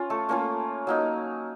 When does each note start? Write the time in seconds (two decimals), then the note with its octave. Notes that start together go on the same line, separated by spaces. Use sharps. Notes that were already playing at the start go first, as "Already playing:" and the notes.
Already playing: C#4 F4
0.10 A3 A4
0.29 A3 A#3 C#4 F4 A#4
0.87 F#3 A#3 D#4